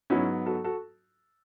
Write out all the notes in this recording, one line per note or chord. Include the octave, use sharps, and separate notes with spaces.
G#2 F#3 B3 C#4 E4
F#4 A4
F#4 A4